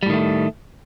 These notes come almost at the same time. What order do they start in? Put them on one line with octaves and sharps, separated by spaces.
G3 A2 D#3 A3